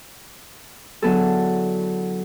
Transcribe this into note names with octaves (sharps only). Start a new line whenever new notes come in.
D3 F#3 B3 E4 G#4 A4